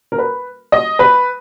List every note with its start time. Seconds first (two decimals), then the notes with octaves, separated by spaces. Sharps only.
0.12 A#4
0.18 B4
0.72 D#5
0.99 B4